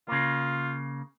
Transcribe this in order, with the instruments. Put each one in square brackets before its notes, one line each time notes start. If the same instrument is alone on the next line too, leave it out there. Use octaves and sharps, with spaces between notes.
[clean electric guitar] C#3 A#3 [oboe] F4